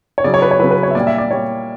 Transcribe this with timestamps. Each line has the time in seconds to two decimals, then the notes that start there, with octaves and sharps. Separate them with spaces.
0.18 C#5
0.24 C#3 F#3 D5
0.34 C#5
0.42 B4
0.51 C#5
0.60 C#3 F#3 B4
0.71 B4
0.83 C#5
0.91 E5
0.95 A#2 G3 D5
1.07 E5
1.18 D5
1.30 A#2 G3 C#5